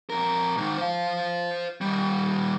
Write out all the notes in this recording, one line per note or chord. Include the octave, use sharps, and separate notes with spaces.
F2 A#4
G#2 D#3
C5 F5
D#3 G3